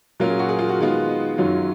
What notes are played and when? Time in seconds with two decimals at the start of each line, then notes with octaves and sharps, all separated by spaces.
0.20 A#2 F#3 C#4 F4 A#4
0.30 G#4
0.39 F#4
0.49 G#4
0.59 F4
0.69 F#4
0.79 D#3 G#3 B3 F4
1.08 D#5
1.38 F#2 D#3 F#3 C#4 F4